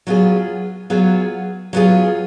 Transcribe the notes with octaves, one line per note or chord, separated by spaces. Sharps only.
F#3 B3 F4 G#4
F#3 B3 F4 G#4
F#3 B3 F4 G#4